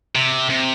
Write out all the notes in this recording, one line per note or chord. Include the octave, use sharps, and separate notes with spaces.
C3
C3